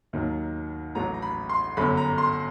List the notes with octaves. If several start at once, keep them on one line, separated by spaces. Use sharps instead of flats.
D#2 D#3 F#3
A1 A2 F#3 A#5
A#5
B5
C6
G1 F#2 D3 F#3 B5
A#5
C6